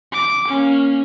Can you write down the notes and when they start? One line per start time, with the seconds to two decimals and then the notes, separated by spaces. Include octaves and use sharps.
0.13 D6
0.48 A#3 C#4